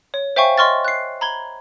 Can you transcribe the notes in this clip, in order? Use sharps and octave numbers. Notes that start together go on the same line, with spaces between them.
C#5
C5 E5 F5 G5 G#5 C#6
D#5 C6 C#6 F6 A6
F#6 C7
A#5 B5 G#6 G7